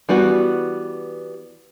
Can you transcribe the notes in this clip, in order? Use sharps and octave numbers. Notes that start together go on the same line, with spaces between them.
E3 G3 B3 F#4